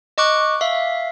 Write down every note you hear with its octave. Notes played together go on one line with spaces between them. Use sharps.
D#5 C#6 D6 F#6
E5 F5